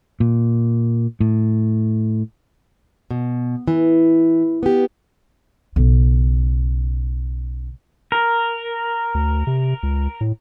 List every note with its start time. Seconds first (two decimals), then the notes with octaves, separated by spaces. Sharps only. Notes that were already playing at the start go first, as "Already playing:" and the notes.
0.20 A#2
1.20 A2
3.11 B2
3.67 E3
4.63 B3 G4
5.76 B1 C#3
8.12 A#4
9.15 D2
9.47 C3
9.83 C#2
10.21 A2